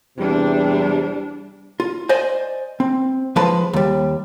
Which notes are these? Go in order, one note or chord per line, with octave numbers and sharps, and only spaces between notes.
E2 C3 G3 D4
F4
C5 D5 D#5 G#5
C4
F3 G#3 B4 A5
D#2 G3